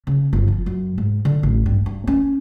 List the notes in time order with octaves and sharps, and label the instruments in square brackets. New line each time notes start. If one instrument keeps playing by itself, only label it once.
[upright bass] C#3
G1
F3
F#2
G#2
D3
A1
G2
G2
C#4